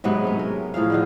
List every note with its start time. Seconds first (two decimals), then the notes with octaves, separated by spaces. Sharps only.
0.04 G#2 C3 F#3 B3
0.24 A3 C#4
0.39 A#4
0.74 A2 F3 G#4 F5
0.90 D3 D#3 F4